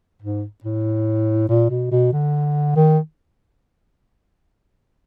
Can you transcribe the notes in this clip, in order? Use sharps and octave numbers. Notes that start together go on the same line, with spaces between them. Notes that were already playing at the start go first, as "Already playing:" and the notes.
G#2
A2
A#2
B2
B2
D3
D#3